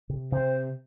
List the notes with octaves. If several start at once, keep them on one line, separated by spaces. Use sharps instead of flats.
C3
C3 C5